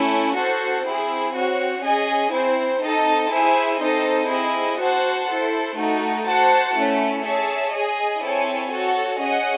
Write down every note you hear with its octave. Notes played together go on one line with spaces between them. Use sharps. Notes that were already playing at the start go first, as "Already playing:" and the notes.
Already playing: A3 C#4 E4
F#4 A4 C5
C4 E4 G#4
C4 F#4 C#5
C#4 G#4 D#5 G#5
C4 E4 C5
C4 D#4 A4 D#5 A5
E4 G#4 C5 E5 G#5
C4 D#4 A4 C5 D#5
C4 E4 G#4 D#5
F#4 C5 F#5 A5
E4 A4 C5
A3 D#4 F#4
F#4 C5 F#5 A5
A3 C#4 E4
G#4 C#5 E5 A5
G#4 D#5 G#5
C4 E4 A4 C#5 G#5
F#4 A4 C#5
C#4 G#4 D#5 F#5